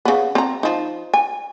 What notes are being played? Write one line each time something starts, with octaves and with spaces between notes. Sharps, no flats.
C#3 B3
C4 A#5
F3 D#4
G#5